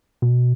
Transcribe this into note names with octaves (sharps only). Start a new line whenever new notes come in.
B2